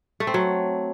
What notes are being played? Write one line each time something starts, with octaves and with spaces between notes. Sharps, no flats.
A3
C4
F#3